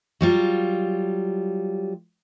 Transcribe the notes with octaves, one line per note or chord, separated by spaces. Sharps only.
F#3 G3 F4